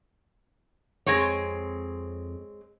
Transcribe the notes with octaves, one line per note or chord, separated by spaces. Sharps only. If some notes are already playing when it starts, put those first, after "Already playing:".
F2 G#3 C4 C#5